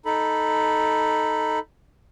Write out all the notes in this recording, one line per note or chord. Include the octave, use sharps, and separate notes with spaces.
D#4 A4 B5